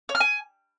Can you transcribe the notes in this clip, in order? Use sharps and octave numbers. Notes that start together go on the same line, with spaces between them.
C#5
F6
G#5